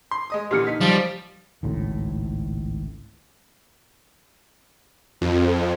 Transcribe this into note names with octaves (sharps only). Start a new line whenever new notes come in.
C6
G#3 D#5 D#6
A#2 D3 E3 G4 F6 C#7
D#4 B6
F3 G3
G#1 C#2 A2
F2